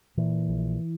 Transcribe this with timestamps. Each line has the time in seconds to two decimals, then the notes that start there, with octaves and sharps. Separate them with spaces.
0.17 A#2 E3
0.49 A#1